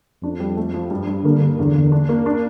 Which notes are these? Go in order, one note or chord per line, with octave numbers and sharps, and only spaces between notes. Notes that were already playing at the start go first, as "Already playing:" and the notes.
F2 D4
G3
A3
F3
G2
G2
D3 A#3
A#3
E2 D3
E2
D4
A#3
D4